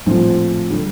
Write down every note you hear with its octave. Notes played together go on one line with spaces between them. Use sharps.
A#1 A2 F3 C4 F4
D3 G3